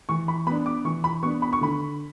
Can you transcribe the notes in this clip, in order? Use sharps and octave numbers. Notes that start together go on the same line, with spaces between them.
E3 C#6
B5
B3 D4 B5
D6
E3 C#6
B5
B3 D4 C#6
B5
C#6
D3 B5